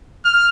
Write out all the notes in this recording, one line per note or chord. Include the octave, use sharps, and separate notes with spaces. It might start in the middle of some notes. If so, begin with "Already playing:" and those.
F6